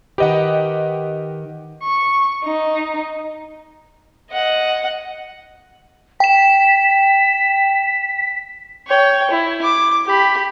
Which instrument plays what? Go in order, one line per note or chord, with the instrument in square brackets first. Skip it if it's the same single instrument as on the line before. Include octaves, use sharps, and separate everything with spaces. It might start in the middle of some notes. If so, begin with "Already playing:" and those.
[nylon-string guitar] D#3 B4 [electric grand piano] G4 D#5 F#5
[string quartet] C#6
D#4
[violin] D#5 F#5
[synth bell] G5 E7 [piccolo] B6
[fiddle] C#5 G5
E4
D6
G4 B5